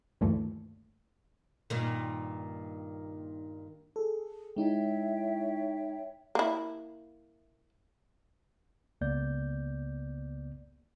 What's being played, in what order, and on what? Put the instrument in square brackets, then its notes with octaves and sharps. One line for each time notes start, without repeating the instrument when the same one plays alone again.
[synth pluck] D2 G2 A#2 D#3 E3 A3
[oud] G2 A#2 D#3
[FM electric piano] G#4 A4
[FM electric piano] G#3 D#4 E4 [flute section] C#5 E5 G5
[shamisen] A#3 E4
[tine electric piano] C#2 C#3 A#3 B3 D5 G6